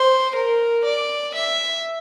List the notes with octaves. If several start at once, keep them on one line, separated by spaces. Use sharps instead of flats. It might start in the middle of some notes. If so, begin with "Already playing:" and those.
Already playing: C5
A#4
D5
E5